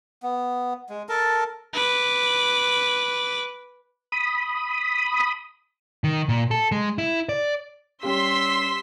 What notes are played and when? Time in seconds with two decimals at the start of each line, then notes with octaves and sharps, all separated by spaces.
0.23 B3
0.90 G#3
1.09 A4 A#4 A5
1.73 B4 D6
4.12 B5 D#6
6.04 D#3
6.29 A#2
6.51 A4
6.72 G#3
6.98 E4
7.29 D5
8.03 G3 C#4 G4 C6 E6 B6